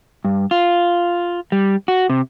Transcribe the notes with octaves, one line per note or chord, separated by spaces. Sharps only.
G2
F4
G3
F#4
C3